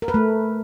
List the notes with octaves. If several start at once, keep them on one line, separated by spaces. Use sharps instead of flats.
A#4
B4
A3